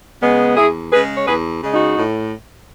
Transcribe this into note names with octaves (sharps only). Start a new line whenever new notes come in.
C#3 G#3 B3
E2 E4 G#4
C#3 G#3 G#4 B4
C#5
E2 G#4 B4
C#3 G#3
D#4 F#4
A2